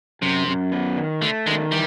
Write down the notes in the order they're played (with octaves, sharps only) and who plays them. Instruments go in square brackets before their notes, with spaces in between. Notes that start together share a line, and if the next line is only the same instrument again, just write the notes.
[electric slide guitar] F#2 [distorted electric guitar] C3
[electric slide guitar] F#2
B3
D#3
[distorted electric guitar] D3 [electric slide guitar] A3
[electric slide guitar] D#3 [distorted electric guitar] G#3
[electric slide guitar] E3 [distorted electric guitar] G3